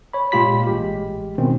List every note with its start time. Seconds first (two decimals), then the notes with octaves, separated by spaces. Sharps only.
0.13 C#5 B5
0.32 A#2 G#3 F4 G4 B5 B6
0.67 A1 G#3 G4
1.38 B2 D#3 C4 C#4